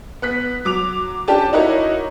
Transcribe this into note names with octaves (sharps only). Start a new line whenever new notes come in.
B3 F#6 B6
F#3 D6 F7
C#4 D4 G4 A5
D#4 E4 F#4 A#4 C#5